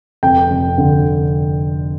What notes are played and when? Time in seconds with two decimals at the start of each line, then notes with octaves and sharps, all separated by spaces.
0.23 F1 G5
0.51 F1
0.78 D3